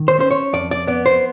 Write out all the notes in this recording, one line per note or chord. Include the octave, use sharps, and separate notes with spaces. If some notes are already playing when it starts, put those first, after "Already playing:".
Already playing: D#3
C5
C#4 C5
C#5
F2 D5
D5
B3 D5
C5